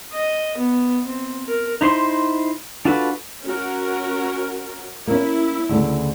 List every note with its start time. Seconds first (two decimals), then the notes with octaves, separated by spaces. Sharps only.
0.13 D#5
0.58 B3
1.05 C4
1.47 A#4
1.81 D#4 E4 C5 C6
2.85 D4 F4 F#4 A4 B4
3.44 C#4 F#4 A#4
5.07 A#3 C#4 E4
5.69 D2 C#3 A3